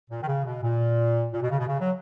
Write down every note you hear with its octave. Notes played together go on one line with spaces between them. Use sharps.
A#2
D#3
C#3
B2
A#2
A#2
B2
C#3
B2
C#3
F#3